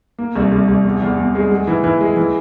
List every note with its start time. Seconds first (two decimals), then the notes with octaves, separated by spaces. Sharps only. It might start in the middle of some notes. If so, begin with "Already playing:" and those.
0.19 A#3
0.36 C2
0.52 C2
0.68 C2
0.84 E2
1.02 E2
1.19 E2
1.35 G#3
1.51 G#3
1.67 E3
1.84 E3
2.01 G#3
2.17 E3